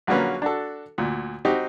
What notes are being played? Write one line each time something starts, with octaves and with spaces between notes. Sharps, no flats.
A#1 D3 F#3 A#3 C#4 B4
D4 F#4 A4
D2 A#2
C4 D#4 F#4 G4